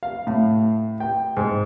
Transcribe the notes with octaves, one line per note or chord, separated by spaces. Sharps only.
F5
A2
G5
G#2